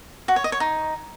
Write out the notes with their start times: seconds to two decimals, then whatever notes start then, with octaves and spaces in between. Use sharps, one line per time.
0.28 F#4
0.36 C#5
0.44 D#5
0.52 C#5
0.60 D#4